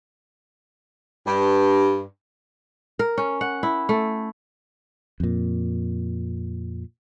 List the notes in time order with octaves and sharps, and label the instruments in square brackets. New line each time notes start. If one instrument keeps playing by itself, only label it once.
[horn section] G2
[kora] A#4
C#4
F#5
E4
A3
[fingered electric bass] F2 A#2